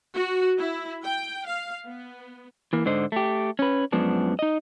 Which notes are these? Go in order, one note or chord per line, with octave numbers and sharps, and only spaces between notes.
F#4
E4
G5
F5
B3
E3 A#3
G#2 D3 C5 D#5
A3 G4
C#4 B4
F#2 F3 G#3 B3 D4
D#4 D#5